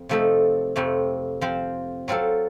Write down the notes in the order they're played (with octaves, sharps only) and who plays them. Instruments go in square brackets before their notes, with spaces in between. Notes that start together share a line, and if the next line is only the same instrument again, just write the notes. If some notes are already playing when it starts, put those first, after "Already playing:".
Already playing: [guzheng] F2
C3 F3 A3 D#4 A4
F2 C3 F3 A3
F3 C4 F4 C5
F#3 C4 F4 A4